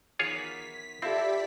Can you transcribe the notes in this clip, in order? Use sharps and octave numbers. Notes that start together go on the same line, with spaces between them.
E2 D#3 F#3 F4 G#4 C#5 B6
C4 E4 F4 G4 A4 D5 B6